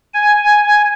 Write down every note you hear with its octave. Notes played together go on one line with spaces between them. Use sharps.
G#5